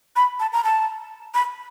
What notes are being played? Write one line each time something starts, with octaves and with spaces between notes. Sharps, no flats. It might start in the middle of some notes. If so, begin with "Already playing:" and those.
B5
A5
A#5
A5
B5